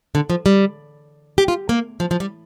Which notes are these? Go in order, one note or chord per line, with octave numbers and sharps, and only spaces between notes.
D3
F3
G3
G4
F4
A#3
F3
F3
G3